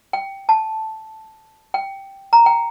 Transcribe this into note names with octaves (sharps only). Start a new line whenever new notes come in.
G5
A5
G5
A#5
G5